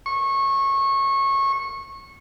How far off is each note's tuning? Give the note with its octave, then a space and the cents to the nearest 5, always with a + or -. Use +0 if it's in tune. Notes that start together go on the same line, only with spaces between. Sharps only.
C#6 -20